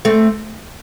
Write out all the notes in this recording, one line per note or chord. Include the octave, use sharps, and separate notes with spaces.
A3 C4